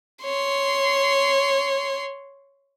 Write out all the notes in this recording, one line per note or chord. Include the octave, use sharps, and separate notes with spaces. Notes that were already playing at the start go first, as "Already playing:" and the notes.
C#5 C6